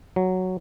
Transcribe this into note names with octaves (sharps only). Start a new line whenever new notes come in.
F#3